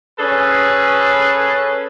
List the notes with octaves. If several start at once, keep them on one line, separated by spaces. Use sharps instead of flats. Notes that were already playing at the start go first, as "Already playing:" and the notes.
C#4 G#4 A4 B4